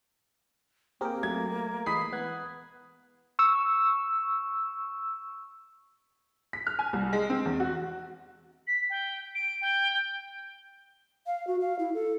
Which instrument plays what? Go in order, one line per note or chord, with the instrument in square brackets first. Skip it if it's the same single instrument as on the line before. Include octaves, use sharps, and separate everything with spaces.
[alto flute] A#3 [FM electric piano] C4 G#4 A#4 [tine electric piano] G4 G5
[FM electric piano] F#3 [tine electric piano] A3 [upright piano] G#6
[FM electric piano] E3 G#3 C7 [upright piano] B5 D#6 B6
[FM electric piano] B3 [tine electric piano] F#5 F#6 G#6
[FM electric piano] C#6 E6
[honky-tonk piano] B6
F6
G#5
C2
G#3
C4
E2
F#4
[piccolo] B6
G5
D7
G5
[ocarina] F5
F#4
F5
E4
A4